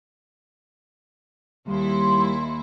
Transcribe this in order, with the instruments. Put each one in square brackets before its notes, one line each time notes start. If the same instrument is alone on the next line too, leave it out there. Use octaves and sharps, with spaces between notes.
[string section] D#2 E4 [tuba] G3 [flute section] C6